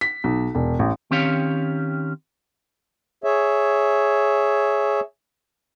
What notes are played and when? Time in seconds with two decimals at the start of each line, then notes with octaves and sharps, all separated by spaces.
0.01 B6
0.24 B1
0.55 E1
0.79 A1
1.11 D#3 C4 C#4 G4 C#5 F5
3.24 G#4 C#5 E5